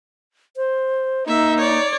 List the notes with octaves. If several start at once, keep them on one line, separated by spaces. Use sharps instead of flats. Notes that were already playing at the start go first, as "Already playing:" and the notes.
C5
A#3 D#4 E5
C#5 D5